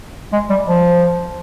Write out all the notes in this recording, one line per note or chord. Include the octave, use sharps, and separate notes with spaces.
G#3
G3
F3